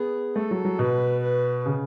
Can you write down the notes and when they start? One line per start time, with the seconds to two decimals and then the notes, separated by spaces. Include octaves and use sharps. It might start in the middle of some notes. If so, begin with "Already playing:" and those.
Already playing: B3 G#4
0.35 A3 A4
0.51 F#3
0.65 F#3
0.79 B2 B4
1.23 B4
1.66 C#3